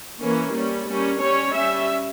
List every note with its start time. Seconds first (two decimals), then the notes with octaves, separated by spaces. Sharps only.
0.20 E3 A#3 C#4
0.55 G3 C#4
0.87 G3 A#3 C#4
1.22 G3 C#4 C#5
1.55 G3 C#4 E5